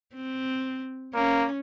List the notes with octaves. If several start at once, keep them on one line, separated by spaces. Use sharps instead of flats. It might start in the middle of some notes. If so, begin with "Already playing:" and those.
C4
A#3 C#4